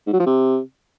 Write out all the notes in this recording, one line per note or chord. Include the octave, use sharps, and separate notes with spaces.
G#2
F#3
F3
C3